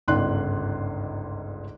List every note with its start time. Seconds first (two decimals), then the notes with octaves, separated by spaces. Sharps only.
0.08 G1 C#2 G#2 D5 C6 F#6